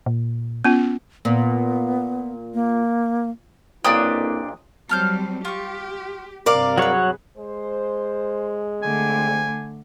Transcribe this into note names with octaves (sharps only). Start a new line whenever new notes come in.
A#2
B3 C#4 F4
A#2 B3
A#3
B1 A#2 A#3 C4 D4 E4 G4 D#6
F#3 G3 C4 A5 F6 G6
F4 G4 C#6
G2 C3 A#4 D5 F5 D6
F#3 G#4 B4 C#5 F#5
G#3 C5
A#2 D3 G3 A3 C4 G#5